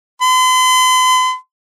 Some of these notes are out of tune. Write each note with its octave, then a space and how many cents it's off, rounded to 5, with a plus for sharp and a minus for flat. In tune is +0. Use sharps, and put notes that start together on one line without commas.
C6 -45